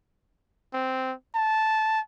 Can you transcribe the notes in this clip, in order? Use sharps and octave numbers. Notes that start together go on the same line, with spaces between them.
C4
A5